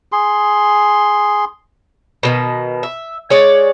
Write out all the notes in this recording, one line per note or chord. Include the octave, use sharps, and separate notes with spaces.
G#4 C6
B2 D3 D#3
E5
G#3 C#5 D5